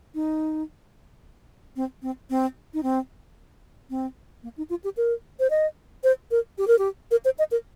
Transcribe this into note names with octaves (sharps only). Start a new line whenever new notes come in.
D#4
C4
C4
C4
D#4
C4
C4
A#3
D#4
F4
G4
A#4
C5
D#5
C5
A#4
G4
A#4
G4
A#4
C5
D#5
A#4